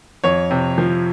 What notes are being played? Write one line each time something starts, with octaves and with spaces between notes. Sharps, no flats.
F2 C#5
C3
F3